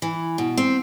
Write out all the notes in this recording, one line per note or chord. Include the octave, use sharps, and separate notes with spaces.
E3
B2
C4